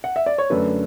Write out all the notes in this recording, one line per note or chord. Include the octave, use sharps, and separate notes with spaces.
F#5
E5
D5
C#5
F#2 D3 A3 D4 B4